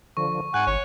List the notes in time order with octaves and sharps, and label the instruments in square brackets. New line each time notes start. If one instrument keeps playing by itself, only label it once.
[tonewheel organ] D3 F3 [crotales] C#6
[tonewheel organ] G#2 [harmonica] F#5 G#5 [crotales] F#6
[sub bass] G#1 [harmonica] C#5